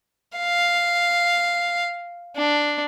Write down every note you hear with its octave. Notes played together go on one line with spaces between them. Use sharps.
F5
D4